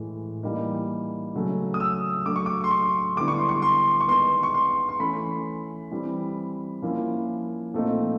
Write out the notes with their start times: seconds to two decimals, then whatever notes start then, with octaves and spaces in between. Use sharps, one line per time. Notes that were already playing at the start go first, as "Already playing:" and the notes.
Already playing: A2 E3 G#3
0.43 E3 G3 A#3 D#4
1.34 C#3 F#3 A3 C#4
1.74 D#6
1.80 E6
2.26 F#3 A3 D4 D6
2.36 C#6
2.46 D6
2.64 C6
2.71 C#6
3.17 D3 G3 B3 E4 D6
3.28 C#6
3.38 C6
3.49 C#6
3.62 C6
4.01 C#6
4.08 D#3 G#3 B3 C6
4.43 C#6
4.54 C6
4.89 C6
4.99 E3 A3 C#4 E4 B5
5.91 E3 G3 C4
6.82 F3 A#3 C#4 E4
7.73 A#2 F3 A3 C4 D#4